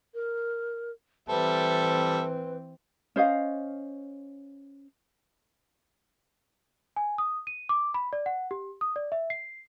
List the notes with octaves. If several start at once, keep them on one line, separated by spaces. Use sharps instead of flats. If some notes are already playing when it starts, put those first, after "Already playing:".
A#4
E3 G3 C4 A4 B4 E5
C#4 C5 D#5 F5
G#5
D#6
D#7
D6
B5
D5
F#5
G4
D#6
D5
E5
C7